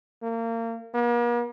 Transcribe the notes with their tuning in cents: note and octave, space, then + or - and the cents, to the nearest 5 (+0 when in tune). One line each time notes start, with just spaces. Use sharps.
A#3 -30
A#3 +45